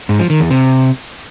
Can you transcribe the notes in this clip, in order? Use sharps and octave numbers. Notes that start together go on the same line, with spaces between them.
G#2
F3
D#3
E2
C3